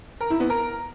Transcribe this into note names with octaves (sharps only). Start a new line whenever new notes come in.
A#4
E4
B3
A#4